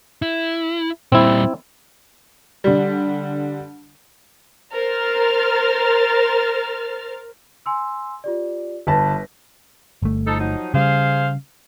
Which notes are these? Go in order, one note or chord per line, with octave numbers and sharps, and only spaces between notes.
E4
A#2 G3 C4 E4
D3 G3
A#4 C5 F6 A6
G#5 C6 E6
F4 G4 D5
G1 B4 A5 A#6 B6
G1 A3
F3 D#4 A4
F3 F#3 D#4
C#3 G3 G#4 C5 F5